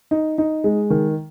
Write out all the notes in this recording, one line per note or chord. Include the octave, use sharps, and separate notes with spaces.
D#4
D#4
G#3
D#3